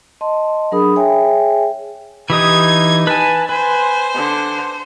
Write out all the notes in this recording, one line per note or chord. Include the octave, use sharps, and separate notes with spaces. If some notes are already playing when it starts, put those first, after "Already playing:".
D#5 A5 C6
F#3 D4 G#4 A#4 B5 D#6
G#4 C#5 E5 G5 G#5
E3 D#4 G4 D#6 G#6
B4 G#5 A5
B4 C5 G#5
D3